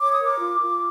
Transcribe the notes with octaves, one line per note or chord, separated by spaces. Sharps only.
C#5 D6
D#6
A#4 D6
F4
F4